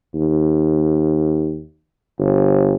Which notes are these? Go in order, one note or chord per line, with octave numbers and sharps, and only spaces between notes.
D#2
G1